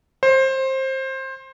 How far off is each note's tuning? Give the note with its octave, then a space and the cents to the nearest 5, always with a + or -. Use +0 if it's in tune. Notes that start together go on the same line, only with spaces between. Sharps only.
C5 +20